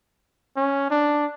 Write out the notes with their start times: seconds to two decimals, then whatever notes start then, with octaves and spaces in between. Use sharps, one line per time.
0.57 C#4
0.90 D4